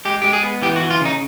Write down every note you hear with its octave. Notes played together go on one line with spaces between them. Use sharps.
G#3 G4
G#3 G4
G#4
B3
E3 G4
F#4
E3
F4
C#3 D#4